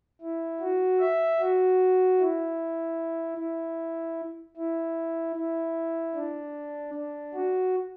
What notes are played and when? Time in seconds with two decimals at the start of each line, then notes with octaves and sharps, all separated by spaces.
0.21 E4
0.60 F#4
1.00 E5
1.39 F#4
2.19 E4
3.38 E4
4.57 E4
5.36 E4
6.15 D4
6.94 D4
7.34 F#4